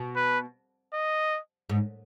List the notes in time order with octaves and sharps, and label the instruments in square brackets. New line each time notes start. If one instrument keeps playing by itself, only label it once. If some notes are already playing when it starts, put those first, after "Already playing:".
Already playing: [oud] B2
[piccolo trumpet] B4
D#5
[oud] G#2